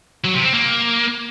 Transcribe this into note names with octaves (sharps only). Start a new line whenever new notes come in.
F#3
C3
C4
A#3